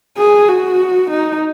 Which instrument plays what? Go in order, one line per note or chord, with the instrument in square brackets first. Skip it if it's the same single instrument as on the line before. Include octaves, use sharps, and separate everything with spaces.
[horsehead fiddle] G#4
F#4
D#4